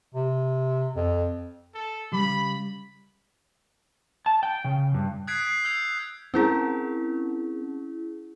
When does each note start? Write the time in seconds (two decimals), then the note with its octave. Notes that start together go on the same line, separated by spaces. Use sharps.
0.14 C3
0.96 F2
1.74 A4
2.13 C#3 G3 B5
4.26 A5
4.43 G5
4.64 C#3
4.94 G2
5.27 D#6 F#6 G#6 B6 C7 D7
5.44 C7
5.65 E6 G6 G#6 F7
6.34 C4 C#4 E4 G#4 A#4